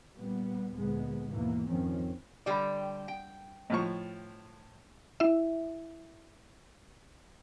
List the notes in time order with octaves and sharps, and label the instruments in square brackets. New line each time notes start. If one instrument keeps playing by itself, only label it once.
[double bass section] A#2 G3 B3
D2 A#2 G#3 B3
D#2 G#2 B2 E3 A#3 B3
F2 D#3 F3 C4 C#4
[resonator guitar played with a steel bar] D3 G3 G5 [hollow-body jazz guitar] D5 B5
[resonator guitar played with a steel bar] G5
[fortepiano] A2 F3 C#6 [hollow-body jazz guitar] D#5
[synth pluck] E4 E5